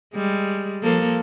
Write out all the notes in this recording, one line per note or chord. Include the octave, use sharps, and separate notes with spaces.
G3 G#3
F3 A#3 A4